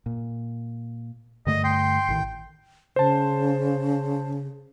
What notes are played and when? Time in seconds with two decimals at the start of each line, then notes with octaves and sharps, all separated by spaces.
0.06 A#2
1.47 G2 D3 A3 D#5
1.64 G5 C6
2.08 A1 A2 D#3
2.96 C#3 C5 A5